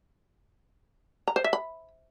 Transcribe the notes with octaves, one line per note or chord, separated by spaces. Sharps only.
A#5
C5
E5
B5